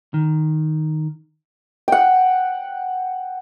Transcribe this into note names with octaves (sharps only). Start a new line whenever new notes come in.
D#3
F#5 G5